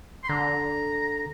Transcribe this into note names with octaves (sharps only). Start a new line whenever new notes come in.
C6
D3 A#5